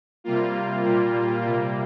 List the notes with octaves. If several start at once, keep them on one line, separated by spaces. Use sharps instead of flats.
C3 G3 A#3 F4
A#2 G3 A#3
C3 G3 A#3